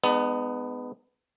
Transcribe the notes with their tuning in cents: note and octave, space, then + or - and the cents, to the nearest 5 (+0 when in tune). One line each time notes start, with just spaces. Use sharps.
G#3 +0 B3 +15 D#4 -40